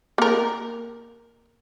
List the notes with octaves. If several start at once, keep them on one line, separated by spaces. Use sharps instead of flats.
A#3 A#4